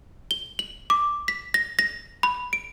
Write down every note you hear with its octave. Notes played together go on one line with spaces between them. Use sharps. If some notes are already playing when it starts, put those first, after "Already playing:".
G7
F#7
D6
B6
A#6
A#6
B5
D7